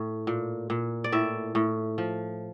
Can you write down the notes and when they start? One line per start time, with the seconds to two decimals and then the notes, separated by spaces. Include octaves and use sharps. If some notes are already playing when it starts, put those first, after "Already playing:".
Already playing: A2
0.27 A#2
0.70 A#2
1.04 D5
1.12 A2 E5
1.55 A2
1.98 F3